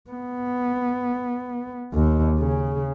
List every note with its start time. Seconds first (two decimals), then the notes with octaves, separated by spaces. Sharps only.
0.11 B3
1.94 D#2
2.39 C#3